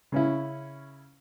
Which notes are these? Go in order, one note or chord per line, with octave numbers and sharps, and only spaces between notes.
C#3 C#4 E4